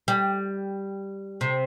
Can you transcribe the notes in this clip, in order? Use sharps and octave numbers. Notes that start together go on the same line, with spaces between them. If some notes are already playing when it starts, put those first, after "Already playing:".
G3
C3